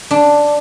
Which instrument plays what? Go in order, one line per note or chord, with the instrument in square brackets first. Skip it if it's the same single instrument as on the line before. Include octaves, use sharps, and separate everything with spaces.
[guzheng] D4